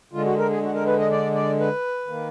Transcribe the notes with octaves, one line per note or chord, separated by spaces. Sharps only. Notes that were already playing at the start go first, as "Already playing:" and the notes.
D3 G#3 F4
F#4
A#4
G#4
F#4
A#4
B4
D#5
D5
D5
B4
D#3 A#3